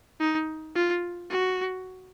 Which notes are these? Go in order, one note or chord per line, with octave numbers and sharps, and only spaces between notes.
D#4
F4
F#4